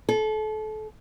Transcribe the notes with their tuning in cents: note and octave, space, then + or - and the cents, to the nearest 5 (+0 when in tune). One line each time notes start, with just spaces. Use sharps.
A4 -30